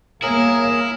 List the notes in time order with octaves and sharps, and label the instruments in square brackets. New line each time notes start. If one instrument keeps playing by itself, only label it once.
[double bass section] A#3 [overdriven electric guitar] E4 [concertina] G#4 A#4 [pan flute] C#5